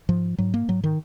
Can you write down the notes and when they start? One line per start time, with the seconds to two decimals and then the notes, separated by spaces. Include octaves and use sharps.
0.09 G#2 F3
0.38 G#2 F#3
0.54 A#3
0.68 G#2 F#3
0.84 D#3